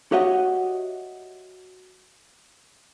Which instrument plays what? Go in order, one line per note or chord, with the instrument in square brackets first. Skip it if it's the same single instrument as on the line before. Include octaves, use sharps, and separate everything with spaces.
[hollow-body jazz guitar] F#4 G4 C#5 D#5 E5 F#5